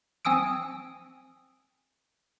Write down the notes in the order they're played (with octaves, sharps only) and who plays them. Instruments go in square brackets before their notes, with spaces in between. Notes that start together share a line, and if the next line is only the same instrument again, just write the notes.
[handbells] C4 G#5 D#6 E6 D7